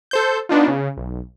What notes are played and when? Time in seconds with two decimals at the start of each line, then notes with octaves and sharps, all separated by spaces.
0.11 A4 C5 G6
0.49 B3 D4 D#4 F4
0.68 C#3
0.97 B1